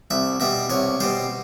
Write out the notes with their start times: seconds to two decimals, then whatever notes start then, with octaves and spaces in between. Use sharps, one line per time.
0.10 C2 E5
0.40 B2 G3 E5
0.70 C2 C#5
1.00 B2 G3 C5